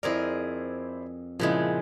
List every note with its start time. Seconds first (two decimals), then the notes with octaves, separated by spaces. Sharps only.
0.03 F2 E4 G#4 A#4 C5 D5
1.40 A#2 C#3 F3 G#3 E4